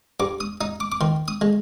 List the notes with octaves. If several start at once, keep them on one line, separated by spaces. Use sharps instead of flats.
G2 D6
D#6
D#4 D#6
D6
D6
D#3 C6
D#6
G#3